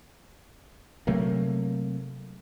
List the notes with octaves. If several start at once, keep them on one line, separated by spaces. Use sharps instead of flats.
C3 F#3 A3 A#3